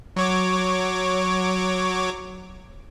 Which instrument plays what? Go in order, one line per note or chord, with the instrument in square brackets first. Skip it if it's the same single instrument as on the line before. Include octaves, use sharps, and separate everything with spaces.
[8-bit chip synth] F#3 C#5 D6